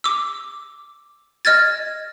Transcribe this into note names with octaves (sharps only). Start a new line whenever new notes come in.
D6 E6
D#5 F6 G#6 A6